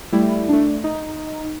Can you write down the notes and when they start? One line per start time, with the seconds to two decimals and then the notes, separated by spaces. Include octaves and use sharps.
0.12 G3 A3 E4
0.49 A3 D4
0.84 D#4